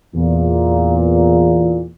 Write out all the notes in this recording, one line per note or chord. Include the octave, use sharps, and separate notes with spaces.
E2 A#2